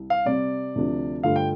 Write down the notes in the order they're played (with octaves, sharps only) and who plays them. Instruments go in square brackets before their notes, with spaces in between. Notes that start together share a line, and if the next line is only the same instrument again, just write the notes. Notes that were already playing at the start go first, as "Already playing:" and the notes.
Already playing: [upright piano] C2
[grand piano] F5
[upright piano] C3 G3 C4 [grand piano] D5
[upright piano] D2 C3 F3 D4
[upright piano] G2 D3 A3 F4 A4 [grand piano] F5
[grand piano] G5